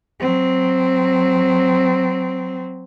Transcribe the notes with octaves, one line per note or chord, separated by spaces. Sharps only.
F#3 C4